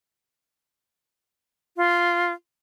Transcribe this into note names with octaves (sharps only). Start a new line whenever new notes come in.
F4